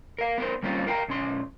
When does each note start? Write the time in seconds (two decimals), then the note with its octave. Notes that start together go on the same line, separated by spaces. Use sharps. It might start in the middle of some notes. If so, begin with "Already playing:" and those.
0.18 A#4 F5
0.38 B3 A#4 C5
0.63 G3 A#3 C4 C#4 F4
0.87 A#4 F5 G5 G#5 A#5
1.08 B1 C#4 C6